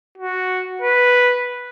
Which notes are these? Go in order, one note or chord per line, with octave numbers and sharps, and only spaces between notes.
F#4
B4